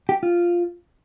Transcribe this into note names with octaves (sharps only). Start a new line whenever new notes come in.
G4
F4